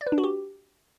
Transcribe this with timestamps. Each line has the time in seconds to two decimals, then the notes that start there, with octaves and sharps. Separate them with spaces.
0.01 D5
0.07 B4
0.12 D4
0.18 F#4
0.23 G4